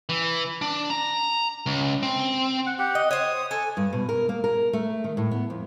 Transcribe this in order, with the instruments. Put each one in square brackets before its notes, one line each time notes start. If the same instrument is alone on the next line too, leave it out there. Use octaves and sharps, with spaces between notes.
[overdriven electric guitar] E3
D4
A#5
C#2
C4
[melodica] F#5
G4 F#5
[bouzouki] D#5
[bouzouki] C5 C#5 [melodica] D#6
[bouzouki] A4 [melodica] G#5
[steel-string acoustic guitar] G2
B2
A#4
A#3
A#4
A3
D#3
A2
B3
F2